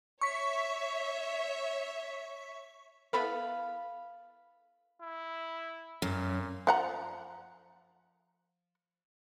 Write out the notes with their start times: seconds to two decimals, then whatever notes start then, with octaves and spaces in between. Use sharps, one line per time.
0.21 C#5 E5 C#6 B6
3.13 B3 E4 A4 F5 B5
5.02 E4
6.02 F#2 A#2
6.67 F3 F#5 A#5